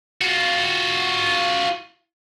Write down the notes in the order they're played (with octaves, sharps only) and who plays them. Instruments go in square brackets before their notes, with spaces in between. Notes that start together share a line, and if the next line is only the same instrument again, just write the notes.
[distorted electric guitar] F4 F#4